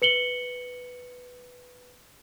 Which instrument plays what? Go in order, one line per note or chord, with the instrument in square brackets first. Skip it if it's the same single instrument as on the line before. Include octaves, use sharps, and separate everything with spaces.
[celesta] B4 C#7 F#7 G7